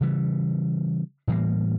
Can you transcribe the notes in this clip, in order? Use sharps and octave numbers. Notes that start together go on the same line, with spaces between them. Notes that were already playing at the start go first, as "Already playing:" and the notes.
C#3 E3 G3
A2 E3 G3 A#3